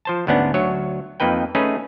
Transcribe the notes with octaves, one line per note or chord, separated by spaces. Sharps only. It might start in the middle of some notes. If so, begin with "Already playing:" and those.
F3 C5 A5
D2 G#2 B3 C#4 D4 F#5
D2 F#3 C#5
F2 A#3 D#4 B4 G5
A3 C#4 D#4 G#4 B4